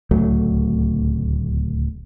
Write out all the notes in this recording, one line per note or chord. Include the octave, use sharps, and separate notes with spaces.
D1 C#2 F#3 A3